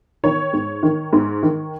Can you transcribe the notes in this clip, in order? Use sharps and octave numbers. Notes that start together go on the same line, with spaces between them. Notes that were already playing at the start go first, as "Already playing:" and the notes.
D#3 C#5
G#2
D#3
G#2
D#3